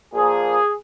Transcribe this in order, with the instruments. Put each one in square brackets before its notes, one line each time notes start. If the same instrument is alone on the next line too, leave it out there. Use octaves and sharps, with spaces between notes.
[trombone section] A#2 F3 A#3 G#4